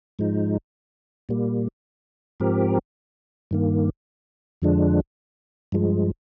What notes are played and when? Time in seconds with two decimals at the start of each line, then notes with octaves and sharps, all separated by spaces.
0.19 G#2 F3 G#3 D#4
1.29 A#2 G3 A#3
2.40 G#2 F3 C4 G4 A#4
3.51 G2 D#3 A#3
4.62 F2 D3 F3 G#3 D4
5.72 G2 F3 G#3